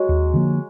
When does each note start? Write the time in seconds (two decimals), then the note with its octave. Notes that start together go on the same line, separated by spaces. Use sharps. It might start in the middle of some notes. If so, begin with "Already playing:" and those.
Already playing: F#3 G#3
0.09 D#2
0.34 D3 F3 A#3